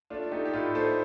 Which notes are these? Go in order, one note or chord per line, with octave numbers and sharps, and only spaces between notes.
A3 D4 F4
A3 D#4 G4
G4
A2 F4 A4
A3 A4 C5